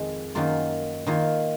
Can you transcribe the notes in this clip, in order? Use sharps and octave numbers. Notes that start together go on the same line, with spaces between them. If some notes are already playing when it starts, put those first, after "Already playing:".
Already playing: F2 D#3 G#3
F#2 D#3 A#3 F4
D#3 A#3 F4